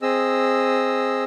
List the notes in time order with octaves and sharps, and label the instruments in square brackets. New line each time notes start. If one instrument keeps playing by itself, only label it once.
[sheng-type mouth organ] C4 G#4 D#5 E6